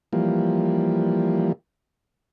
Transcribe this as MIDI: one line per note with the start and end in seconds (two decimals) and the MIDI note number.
0.13 1.52 52
0.13 1.52 53
0.13 1.52 55
0.13 1.52 58